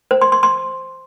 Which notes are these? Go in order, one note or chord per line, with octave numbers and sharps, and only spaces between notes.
C5
C6
C6
C6